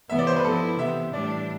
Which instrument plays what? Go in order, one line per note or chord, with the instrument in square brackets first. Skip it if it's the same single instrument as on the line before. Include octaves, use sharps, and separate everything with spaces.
[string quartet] C3 E3 B3 [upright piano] E5
[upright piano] D5
C5
B4
[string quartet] F3 B3 E4 [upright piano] A4
[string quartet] C3 E3 B3 [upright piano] E5
[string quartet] A2 E3 G3 D4 [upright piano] D5